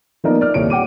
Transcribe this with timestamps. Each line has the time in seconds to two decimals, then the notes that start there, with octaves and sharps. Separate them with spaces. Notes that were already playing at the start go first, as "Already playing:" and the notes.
0.24 F3 A#3 B3 D#4 A#4 D5
0.41 D5 F6
0.54 D#1 C2 A#2 C#5 D7
0.70 F#5 G5 D6 D#7